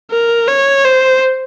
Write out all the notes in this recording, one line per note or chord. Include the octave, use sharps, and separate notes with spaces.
A#4
C#5
C5